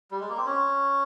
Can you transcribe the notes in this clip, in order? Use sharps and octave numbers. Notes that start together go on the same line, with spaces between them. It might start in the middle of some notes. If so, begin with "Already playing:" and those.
G3
G#3
A#3
C4
C#4